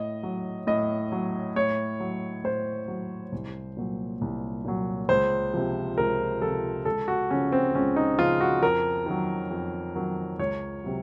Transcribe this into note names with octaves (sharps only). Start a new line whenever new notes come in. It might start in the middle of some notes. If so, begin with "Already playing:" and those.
Already playing: A2 D#5
F#3
A2 D#5
F#3
A2 C#5
F#3
A2 C5
F#3
C2
A#2 F#3
C2
A#2 F#3
C#2 C5
C3 F3
C#2 A#4
C3 F3 A4
C#2 A4
F#4
C#3 F3 C#4
C4
C#2 C#4
D#4
C#3 F3 F4
F#4
F2 A#4
D#3 F#3
F2
D#3 F#3
C#2 C#5
C3 F#3